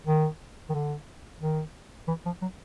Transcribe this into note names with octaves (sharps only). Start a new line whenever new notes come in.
D#3
D#3
D3
D#3
E3
F3
F#3